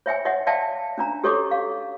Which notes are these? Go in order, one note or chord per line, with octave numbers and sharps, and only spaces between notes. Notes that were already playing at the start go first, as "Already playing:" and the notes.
C#5 E5 G5 G#5
C#5 D#5 E5 F#5
D5 E5 F5 G5 A5
C#4 D4 A#5
G4 A4 C#5 D#5 C#6 D6
F5